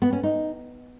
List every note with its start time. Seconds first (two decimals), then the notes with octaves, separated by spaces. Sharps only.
0.02 B3
0.13 C#4
0.23 D#4